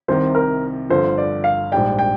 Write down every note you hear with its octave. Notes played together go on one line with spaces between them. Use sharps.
C2 C3 D#3 C5
A#4
G1 G2 D3 F3 C5
D5
F5
A#1 G#2 G3 D4 G5
G5